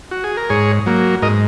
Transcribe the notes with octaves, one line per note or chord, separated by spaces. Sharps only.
F#4
G#4
A#4
G#2 G#4 C#5
F#3 A#3
G#2 A#4 D#5